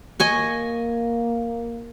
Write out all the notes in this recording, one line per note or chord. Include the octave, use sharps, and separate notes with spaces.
A#3 D#5 G#5 C#6